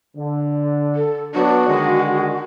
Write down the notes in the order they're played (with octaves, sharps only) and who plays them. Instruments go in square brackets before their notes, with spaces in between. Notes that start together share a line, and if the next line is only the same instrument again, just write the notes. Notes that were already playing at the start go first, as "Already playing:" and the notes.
[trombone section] D3
[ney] A4
[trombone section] F#3 B3 D4 [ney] F#4
[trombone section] D3 D#3 G#3